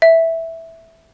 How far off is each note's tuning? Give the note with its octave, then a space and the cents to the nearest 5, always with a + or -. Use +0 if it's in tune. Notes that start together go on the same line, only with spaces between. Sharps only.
E5 -5